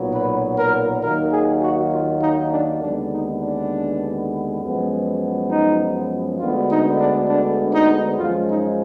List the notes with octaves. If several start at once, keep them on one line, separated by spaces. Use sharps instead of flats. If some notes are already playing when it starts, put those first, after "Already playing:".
Already playing: B1 A#2 F#3 B3
B4
A#4
D#2 D#3 F#3 A#3 A#4
G#4
F#4
F4
D#4
D4
D#2 D3 G#3 B3 D4
D#4
D4
F#2 F3 G#3 B3
D#4
D2 D3 G#3 B3 F4
D#4
D4
D4
D#4
F#2 F3 G#3 F4
D#4